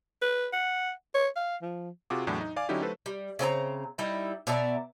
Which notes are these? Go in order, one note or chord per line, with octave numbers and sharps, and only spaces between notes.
B4
F#5
C#5
F5
F3
C3 F4 F#4 G#4 D6
E2 A2 F#3 D4
D#4
D5 F5 G#5 D6
D3 F#3 C#4 D#4 E4 G4
F#3 A3 A4 B4 C5
G3
C#3 C4 G#4 A#5
G3 D#4 E4
B2 D5 E5 A#5